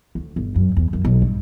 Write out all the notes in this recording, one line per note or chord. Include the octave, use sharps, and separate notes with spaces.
D2
G1
F#2
E2
F#2
B1
G2